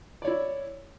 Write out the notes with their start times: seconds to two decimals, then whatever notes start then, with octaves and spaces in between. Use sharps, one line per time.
0.22 D5
0.25 C#5
0.27 E4